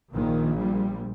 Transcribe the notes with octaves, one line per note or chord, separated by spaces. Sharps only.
A#1 A#2 D#3
G3